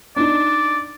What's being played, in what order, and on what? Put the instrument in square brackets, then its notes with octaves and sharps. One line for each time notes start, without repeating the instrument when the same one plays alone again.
[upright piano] D4 D#4 [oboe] D5